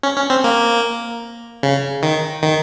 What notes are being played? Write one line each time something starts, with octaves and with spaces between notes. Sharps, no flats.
C#4
C#4
C4
A#3
C#3
D#3
D#3